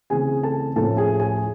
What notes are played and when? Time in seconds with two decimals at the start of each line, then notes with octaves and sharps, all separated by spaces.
0.10 C#3 E3 A3 C4 G#4 G#5
0.43 A4 A5
0.76 A2 F3 A3 C#4 A4 A5
0.97 G#4 G#5
1.20 G#4 G#5